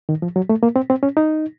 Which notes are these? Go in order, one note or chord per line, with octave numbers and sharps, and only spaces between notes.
D#3
F3
F#3
A3
A#3
C4
C4
C#4
D#4